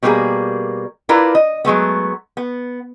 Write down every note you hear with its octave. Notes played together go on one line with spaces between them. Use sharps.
B2 G3 A#3 F#4 G#4 A#4
D4 E4 F4 A#4 B4 D5
D#5
F#3 G#3 A3 B3
B3